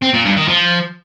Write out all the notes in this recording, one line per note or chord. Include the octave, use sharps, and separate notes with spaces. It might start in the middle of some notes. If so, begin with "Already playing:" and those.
C4
A#2
G2
D#3
F3